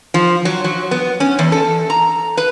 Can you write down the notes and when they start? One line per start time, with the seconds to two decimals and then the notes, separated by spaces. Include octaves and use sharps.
0.14 F3
0.45 F#3
0.64 F#3
0.91 B3
1.20 C#4
1.39 E2
1.52 A4
1.90 A#5
2.37 B4